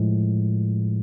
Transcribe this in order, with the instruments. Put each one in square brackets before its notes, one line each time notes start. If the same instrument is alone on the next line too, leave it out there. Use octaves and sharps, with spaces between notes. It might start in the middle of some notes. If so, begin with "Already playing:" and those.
Already playing: [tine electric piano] A2 F3 G#3